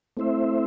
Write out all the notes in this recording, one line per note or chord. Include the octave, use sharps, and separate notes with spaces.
A3 C4 E4 C5 E5